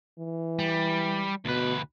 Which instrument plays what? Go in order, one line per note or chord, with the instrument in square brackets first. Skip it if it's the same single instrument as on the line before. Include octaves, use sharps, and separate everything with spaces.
[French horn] E3
[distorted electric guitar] G3
[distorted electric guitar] D2 B4 [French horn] B2